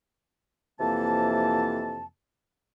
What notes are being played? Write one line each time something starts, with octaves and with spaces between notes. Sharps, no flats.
F2 C3 E3 A#3 A5